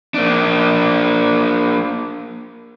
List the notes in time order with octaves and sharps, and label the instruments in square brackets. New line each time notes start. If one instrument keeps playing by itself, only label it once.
[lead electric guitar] A#3 D4